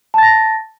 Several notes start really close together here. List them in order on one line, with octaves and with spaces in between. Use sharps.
A5 A6 A#6